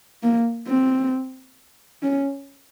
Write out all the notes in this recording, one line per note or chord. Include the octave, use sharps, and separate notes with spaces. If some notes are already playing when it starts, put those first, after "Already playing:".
A#3
C4
C#4